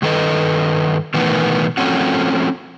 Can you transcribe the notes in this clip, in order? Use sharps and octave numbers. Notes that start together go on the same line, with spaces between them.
G2 D#3 A4 B4 D#5
B2 D#3 E3 A3 B3
F3 A3 C4 C#4 F#4